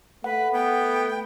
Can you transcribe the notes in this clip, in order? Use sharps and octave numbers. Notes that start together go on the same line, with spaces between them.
A3 B4 F#5
B3 G5